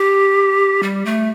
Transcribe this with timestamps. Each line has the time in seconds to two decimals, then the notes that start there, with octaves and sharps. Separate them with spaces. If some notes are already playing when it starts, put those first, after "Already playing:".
Already playing: G4
0.83 G3
1.05 A3